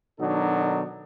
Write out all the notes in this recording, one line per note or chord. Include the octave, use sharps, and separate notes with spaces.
B2 D#3 F#3 D4 D#4 A4